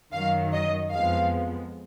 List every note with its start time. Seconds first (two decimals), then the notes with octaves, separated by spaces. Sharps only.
0.13 F#2 D#3 F#3 F5
0.53 D#5
0.92 F2 F3 G#3 B3 F5